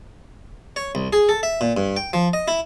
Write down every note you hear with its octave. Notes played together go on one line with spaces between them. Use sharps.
C#5
C2
G#4
A4
E5
A#2
G2
G5
F3
D#5
E4